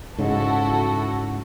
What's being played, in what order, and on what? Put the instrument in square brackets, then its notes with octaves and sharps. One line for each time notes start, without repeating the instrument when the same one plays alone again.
[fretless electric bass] G#2 C#3 G#3 [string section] E4 F#4 A4